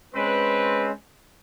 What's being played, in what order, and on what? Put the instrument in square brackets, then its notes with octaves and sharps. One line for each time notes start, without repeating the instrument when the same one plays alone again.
[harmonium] G#3 C#4 [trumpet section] C4 B4